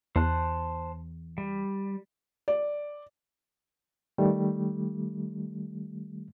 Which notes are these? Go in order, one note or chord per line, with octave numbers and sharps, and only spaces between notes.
E2 C5 A5 F#6
G3
D5
D#3 G3 A3